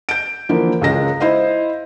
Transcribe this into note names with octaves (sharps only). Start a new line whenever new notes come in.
G6 D7
D3 E3 F3 A#3
C#2 C#3 G#3 A#6
E4 C5 D#5 F5